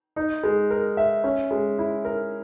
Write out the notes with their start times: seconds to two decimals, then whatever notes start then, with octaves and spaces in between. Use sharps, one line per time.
0.16 D#4
0.43 G#3
0.70 A#4
0.97 E5
1.24 C#4
1.51 G#3
1.79 E4
2.05 A#4